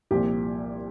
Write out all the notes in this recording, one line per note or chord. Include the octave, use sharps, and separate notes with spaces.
C2 A#2 F3 G4